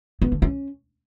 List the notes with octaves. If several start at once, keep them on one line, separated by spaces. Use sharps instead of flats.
B3
D3
C#4